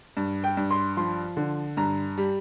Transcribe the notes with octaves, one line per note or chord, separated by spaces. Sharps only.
G2
G5
G2
C6
F3 C6
D3
G2 A#5
G3